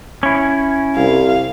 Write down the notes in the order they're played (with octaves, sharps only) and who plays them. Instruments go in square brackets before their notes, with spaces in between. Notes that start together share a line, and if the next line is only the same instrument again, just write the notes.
[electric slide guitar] C#4 E4
[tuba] C2 [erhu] F5